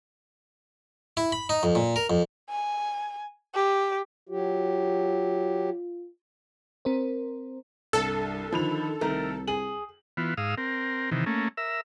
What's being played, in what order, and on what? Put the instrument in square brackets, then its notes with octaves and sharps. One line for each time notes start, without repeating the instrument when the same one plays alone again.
[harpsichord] E4
B5
D#4
F2
A#2
A#4
F2
[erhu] G#5
G4
[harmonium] F#3 G4 [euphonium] F4
[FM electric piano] C4 A#4 C5
[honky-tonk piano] C2 [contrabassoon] G2 [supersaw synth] A4
[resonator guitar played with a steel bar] D3 [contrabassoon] D#3 [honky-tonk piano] F3 B5 F7
[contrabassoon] C2 [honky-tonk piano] D#3 [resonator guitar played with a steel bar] A3 A#4
[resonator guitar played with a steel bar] G#4 [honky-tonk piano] F#7
[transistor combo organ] E3 B3 F4
G#2 F5 D#6 E6
C4 A#4
C3 D#3 E3
A3 A#3 C#4
A#4 E5 E6